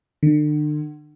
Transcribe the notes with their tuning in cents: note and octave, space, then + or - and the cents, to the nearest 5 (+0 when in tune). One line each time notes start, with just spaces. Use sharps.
D3 +40